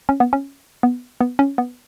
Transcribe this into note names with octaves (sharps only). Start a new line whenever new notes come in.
C#4
B3
C#4
B3
B3
C#4
B3